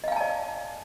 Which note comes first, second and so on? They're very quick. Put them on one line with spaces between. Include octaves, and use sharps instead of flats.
D#5 F5 G#5 A5 D5